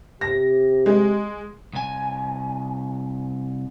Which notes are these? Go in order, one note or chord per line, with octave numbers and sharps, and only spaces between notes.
C3 G4 A#6
G#3
C2 G#5